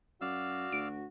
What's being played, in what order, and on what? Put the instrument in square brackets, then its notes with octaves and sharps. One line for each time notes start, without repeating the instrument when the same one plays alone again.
[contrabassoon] F#2 [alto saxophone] F#4 [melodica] D5 F5 E6
[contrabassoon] D2 [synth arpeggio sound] D7